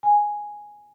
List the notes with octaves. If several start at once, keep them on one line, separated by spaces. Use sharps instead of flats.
G#5